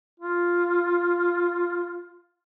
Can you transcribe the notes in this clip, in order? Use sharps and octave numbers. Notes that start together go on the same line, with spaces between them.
F4